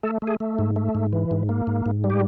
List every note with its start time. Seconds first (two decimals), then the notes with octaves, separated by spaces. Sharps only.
0.03 A3 A4
0.22 A3
0.27 G#4
0.40 A3
0.59 G#2
0.76 A3
0.95 G#2
1.13 E3
1.31 G#2
1.49 A#3
1.67 G#2
1.86 G#2
2.04 G3
2.10 G4